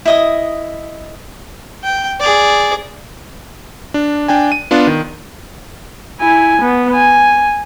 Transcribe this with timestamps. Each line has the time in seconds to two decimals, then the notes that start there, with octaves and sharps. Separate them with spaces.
0.05 E4 D#5 D#6
1.83 G5
2.20 G#4 D5
3.94 D4
4.28 D4 G5 G#5
4.52 D#7
4.71 B3 D4 F4
4.87 D#3
6.20 E4 G#5
6.61 B3
6.95 G#5